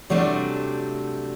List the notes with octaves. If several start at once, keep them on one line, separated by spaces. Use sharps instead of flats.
C3 F#3 G3 A3 D4